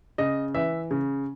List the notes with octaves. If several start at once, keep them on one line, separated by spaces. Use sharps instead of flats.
C#3 D#5
E3 E5
C#3